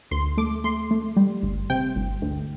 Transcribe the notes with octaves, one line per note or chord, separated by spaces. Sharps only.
D2 C6
A3 D6
A3 C6
A3
G3
G1
C3 G5
G1
D2